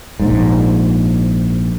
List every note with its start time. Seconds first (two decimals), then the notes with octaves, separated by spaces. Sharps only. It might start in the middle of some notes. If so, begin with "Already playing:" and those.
0.20 A#1 G#2